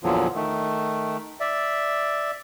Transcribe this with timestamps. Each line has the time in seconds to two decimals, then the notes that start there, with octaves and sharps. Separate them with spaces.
0.03 E2 A#2 D3 F3 F#3
0.35 D#3 A3
1.40 D5 E5